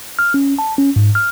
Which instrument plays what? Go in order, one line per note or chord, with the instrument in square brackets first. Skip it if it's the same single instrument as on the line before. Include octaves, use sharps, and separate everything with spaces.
[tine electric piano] F6
C#4
A5
C#4
G#2
F6